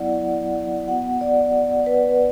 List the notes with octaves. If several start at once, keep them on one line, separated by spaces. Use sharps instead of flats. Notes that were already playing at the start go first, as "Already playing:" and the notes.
Already playing: F#3 B3 E4 D5 F#5
B3 F#4 F#5
D5
B4